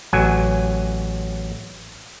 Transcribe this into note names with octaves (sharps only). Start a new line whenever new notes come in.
A1 F#3 G#5